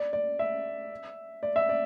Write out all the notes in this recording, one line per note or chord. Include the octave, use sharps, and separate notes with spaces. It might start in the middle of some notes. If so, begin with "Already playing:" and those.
Already playing: D5
D5
E5
D5
E5
D5